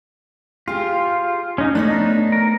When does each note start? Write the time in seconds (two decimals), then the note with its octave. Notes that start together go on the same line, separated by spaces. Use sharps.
0.68 F4 G4 G#4
1.58 C#4 D#4
1.75 A3 B3 D4 D#4 C#5
2.32 A#4